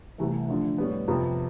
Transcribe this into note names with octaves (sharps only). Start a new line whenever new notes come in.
C2 C3 E3 A3
D3 F3 A3
A2 G3 B3
F2 C3 F3 B3